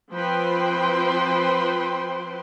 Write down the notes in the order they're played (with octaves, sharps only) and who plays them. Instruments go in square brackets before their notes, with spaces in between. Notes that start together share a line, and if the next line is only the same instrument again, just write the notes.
[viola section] F3 C4 B4 C5 G5 C6